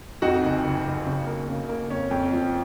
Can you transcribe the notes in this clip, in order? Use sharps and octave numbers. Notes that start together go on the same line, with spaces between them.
F2 D#4 F#4
F#1
F#1
F#1
C#3
A#3
C#3
A#3
F2 C#4
F2
F3